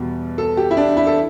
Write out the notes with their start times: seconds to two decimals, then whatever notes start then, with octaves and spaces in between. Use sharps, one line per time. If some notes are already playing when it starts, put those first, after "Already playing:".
Already playing: E2 B2 G3
0.38 A4
0.57 G4
0.71 E4
0.77 D4
0.97 E4
1.07 A4